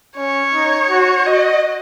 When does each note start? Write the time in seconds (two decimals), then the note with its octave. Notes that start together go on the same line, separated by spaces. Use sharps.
0.17 C#4 C#5
0.54 D#4
0.89 F#4
1.26 F#4 D#5